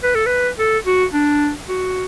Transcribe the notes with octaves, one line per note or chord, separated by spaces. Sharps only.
B4
A4
B4
A4
F#4
D4
F#4